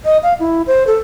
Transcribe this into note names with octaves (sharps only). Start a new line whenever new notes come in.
D#5
F5
E4
C5
A4